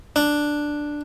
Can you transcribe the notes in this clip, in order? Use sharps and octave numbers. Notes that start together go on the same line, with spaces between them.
D4